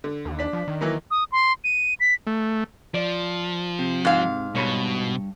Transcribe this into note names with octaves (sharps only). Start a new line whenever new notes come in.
D3
D#2
D4 B6
F3
D#3
E3 F#3 A#3
D#6
C6
D#7
B6
A3
F3 D5
C3
G#2 F5
G2 B2 C#5 B5